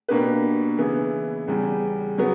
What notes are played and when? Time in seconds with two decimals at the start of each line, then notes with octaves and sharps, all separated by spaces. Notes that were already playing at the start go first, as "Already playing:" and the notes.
0.08 B2 A#3 D4 G4 B4
0.78 C#3 E3 B3 E4
1.48 E2 C#3 G3
2.18 C#3 F#3 B3